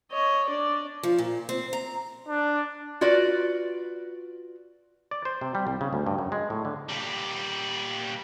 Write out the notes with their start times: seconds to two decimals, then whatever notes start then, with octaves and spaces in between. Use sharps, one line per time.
0.12 C#5 D#5
0.47 D4 D5
1.03 F3
1.18 A#2
1.49 C4
1.73 A#5
2.28 D4
3.01 F4 F#4 B4 D5
5.11 D5
5.25 C5
5.41 C3
5.55 G3
5.67 C2
5.81 C#3
5.93 D2
6.06 G2
6.19 F#2
6.32 G#3
6.50 A2
6.65 D3
6.88 A#2 G3